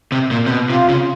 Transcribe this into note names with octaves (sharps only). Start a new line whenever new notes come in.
C3
A#2
C3
B2
C3 F4
C#3